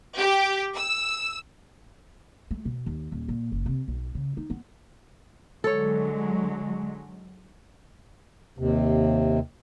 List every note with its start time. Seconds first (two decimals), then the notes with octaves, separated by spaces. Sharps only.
0.17 G4
0.76 E6
2.51 A3
2.65 B2
2.86 D#2
3.12 D#1
3.28 A#2
3.52 F#1
3.66 C3
3.88 B1
4.15 C#3
4.37 D#4
4.50 B3
5.64 D3 F#3 G#3 A4 C#5
8.59 D#2 C3